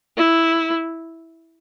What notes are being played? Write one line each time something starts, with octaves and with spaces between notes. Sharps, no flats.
E4